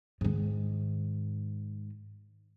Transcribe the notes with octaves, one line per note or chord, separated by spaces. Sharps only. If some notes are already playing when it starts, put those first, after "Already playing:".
G#2 D#3